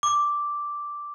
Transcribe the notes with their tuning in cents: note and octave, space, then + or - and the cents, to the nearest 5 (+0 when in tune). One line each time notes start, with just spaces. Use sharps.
D6 -5